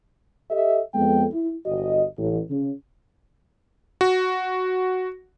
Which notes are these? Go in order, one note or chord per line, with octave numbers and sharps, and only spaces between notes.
G4 A4 D#5 E5
F2 G#3 B3 A4 G5
E4
G1 F#4 D#5
A1
C#3
F#4